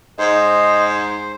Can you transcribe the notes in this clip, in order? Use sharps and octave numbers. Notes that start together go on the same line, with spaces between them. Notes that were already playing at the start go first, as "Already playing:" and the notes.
G#2 C5 D#5